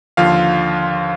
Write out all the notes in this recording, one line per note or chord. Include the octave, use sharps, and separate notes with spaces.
D#2 D3 F3 F4 F5